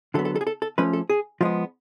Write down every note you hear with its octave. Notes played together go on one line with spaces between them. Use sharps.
D3 F#3 B3 A4
A4
A4
G#4
A4
A4
F3 A3 C#4 B4
A4
G#4
F3 G#3 B3 F4